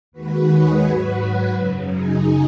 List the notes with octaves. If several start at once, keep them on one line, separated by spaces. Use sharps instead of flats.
D#2 D#3 G#3 F#4 B4
G#4 C#5
G#2 F#3 F#4 B4
F#2 C#3 F#3
D#4 G#4